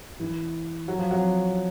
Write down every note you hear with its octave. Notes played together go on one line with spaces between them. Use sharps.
E3
F#3
F3
F#3